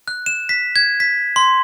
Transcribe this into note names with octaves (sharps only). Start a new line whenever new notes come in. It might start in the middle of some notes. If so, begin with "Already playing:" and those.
F#6
E7
B6
G#6
B6
C6